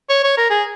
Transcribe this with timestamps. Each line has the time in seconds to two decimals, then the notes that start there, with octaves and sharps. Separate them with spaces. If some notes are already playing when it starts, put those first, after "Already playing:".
0.09 C#5
0.24 C#5
0.37 A#4
0.50 G#4